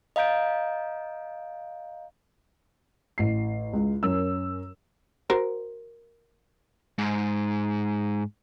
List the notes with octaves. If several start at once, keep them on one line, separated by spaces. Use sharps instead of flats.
D#5 F5 A#5 G6 D7
A1 C7
C#2 G#3
F#2 C#4 A#4 E6
F#4 A#4 C5
G#2